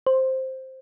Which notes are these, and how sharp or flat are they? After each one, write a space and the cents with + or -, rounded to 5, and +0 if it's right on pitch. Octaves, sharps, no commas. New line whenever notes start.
C5 +5